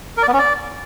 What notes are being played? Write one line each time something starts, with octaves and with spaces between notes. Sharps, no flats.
A#4
D5
B3
C#4
D5